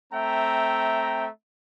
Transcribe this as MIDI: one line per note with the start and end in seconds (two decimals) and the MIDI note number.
0.13 1.28 57
0.13 1.28 60
0.13 1.28 76
0.13 1.28 79
0.13 1.28 82